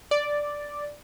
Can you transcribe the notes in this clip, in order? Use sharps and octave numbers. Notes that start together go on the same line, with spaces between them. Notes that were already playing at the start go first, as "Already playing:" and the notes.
D5